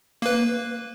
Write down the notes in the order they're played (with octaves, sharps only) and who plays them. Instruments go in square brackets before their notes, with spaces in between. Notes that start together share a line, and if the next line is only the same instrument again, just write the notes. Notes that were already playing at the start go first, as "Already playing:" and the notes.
[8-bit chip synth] A#3 B4